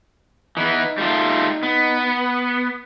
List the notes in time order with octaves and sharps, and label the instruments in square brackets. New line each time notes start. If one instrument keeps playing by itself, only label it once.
[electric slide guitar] E3 B3 [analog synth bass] D#4
[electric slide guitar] G3 A3 F4
B3